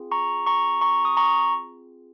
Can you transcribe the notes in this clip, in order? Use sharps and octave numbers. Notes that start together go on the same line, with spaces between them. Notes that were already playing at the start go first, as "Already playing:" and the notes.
Already playing: C4 F4 G#4
A#5 C#6
A#5 C#6
A#5 C#6
D#6
A#5 C#6